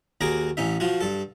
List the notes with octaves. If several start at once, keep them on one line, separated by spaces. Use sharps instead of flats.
D#2 F#4 G#4 A#4 A#5 D6
A1 C#4 D#4 E5
F3 F4 F#4
G2 A4